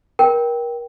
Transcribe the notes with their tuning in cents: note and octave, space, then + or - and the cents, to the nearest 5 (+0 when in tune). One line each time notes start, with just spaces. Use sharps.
A#4 +30 G5 +0